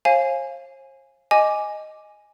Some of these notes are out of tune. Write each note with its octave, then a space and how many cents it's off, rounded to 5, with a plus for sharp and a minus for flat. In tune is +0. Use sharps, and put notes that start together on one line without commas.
C5 +45 F5 -10 G#5 +0
D#5 +0 G#5 +0 D6 +0